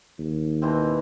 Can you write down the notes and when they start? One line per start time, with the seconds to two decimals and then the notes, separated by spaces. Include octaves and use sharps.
0.18 D#2
0.62 B2 E3 C4